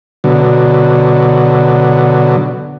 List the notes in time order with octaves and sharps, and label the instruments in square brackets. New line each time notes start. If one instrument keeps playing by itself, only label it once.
[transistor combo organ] B2 D3 F#3